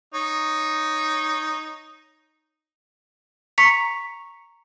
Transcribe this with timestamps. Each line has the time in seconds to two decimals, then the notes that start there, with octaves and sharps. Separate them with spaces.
0.14 D#4 C#5
3.58 A#5 C#6 B6 C#7 F7